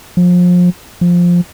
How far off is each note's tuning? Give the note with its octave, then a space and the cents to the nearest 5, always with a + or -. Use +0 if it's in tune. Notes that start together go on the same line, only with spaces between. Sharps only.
F3 +30
F3 +5